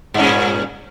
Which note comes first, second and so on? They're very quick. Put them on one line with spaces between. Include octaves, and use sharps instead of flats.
G2 C#4 A#2